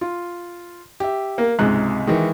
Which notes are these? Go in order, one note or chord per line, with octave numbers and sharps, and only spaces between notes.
F4
G4 E5
A#3
C#2 G#2 C3 F#6
D#3 E3 G#3